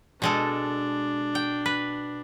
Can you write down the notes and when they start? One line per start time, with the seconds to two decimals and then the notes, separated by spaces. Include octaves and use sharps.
0.22 B2 G#3 D4 A4
1.35 G5
1.66 B4